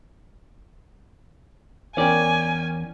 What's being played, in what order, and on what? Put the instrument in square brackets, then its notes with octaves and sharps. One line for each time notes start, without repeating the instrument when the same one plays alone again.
[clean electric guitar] E2 D5 [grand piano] C#4 A#4 G5 [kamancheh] G#5